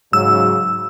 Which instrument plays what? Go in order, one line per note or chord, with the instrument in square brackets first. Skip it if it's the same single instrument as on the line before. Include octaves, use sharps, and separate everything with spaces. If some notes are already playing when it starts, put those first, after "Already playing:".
[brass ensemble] G#2 C#3 F#3 [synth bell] E6